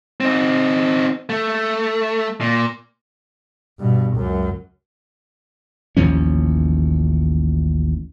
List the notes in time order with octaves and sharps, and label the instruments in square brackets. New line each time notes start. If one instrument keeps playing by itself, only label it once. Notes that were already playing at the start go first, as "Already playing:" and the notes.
[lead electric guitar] C4 D#4
A3
A#2
[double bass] G2 B2
C#2 F#2
[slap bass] A1 D#2 F3 C#4